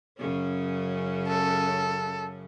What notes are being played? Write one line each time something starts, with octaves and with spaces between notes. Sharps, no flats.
F#2 C#3 C#4
A4